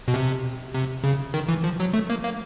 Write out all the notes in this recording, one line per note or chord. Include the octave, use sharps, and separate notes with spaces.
B2
C3
C3
C#3
D#3
E3
F3
F#3
A3
A#3
A#3